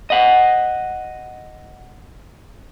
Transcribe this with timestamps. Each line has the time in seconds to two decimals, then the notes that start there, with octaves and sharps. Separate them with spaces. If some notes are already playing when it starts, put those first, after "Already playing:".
0.10 D#5 F#5